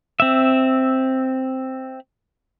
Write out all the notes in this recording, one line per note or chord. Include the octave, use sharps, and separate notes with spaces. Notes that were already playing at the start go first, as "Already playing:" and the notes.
C4 E5